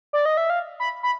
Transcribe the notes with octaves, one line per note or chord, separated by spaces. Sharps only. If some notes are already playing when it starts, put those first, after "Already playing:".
D5
D#5
E5
F5
B5
B5